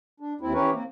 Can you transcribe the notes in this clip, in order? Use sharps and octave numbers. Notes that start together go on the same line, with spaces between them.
D4
D#2 C4 E4
E3 C#4 G4 A#4 B4 C#5
A#3 C4